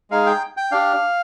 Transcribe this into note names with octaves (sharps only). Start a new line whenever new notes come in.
G#3 D#4 G#4 F5
G5
G5
D4 G4 F5